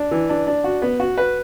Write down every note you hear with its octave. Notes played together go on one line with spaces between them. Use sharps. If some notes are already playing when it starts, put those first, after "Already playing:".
Already playing: D4
E3
D4
D4
F#4
B3
F#4
B4